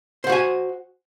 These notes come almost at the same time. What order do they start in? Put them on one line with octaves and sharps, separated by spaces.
C5 F#5 F#4 G#5